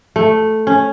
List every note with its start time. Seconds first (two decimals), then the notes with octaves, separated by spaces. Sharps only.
0.16 A3
0.67 C#4